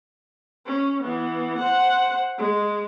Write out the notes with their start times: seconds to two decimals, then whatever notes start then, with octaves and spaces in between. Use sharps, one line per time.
0.66 C#4
1.04 E3 B3
1.59 C5 F#5
2.38 G#3